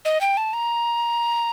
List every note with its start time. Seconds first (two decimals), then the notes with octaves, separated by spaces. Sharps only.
0.05 D#5
0.21 G5
0.37 A5
0.53 A#5